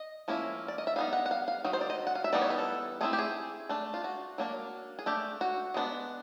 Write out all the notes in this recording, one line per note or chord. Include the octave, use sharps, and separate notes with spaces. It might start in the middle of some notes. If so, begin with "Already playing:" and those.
Already playing: D#5
F3 A#3 C#4 E4
D5
D#5
E5
G3 B3 D#4 F5
F#5
F#5
F5
F5
D#3 F#3
C5
D5
D#5
F#5
F5
E5
E3 G3 B3 D#4 D5
C#5
B4
A4
A3 C4 E4 G#4
G4
G#4
A3 D4
F4
F#4
F#3 A#3 D4
G#4
A3 D4 G4
F#4
G#3 B3 D4